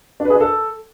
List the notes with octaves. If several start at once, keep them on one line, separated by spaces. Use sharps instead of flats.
D4
B4
G#4
D4
A4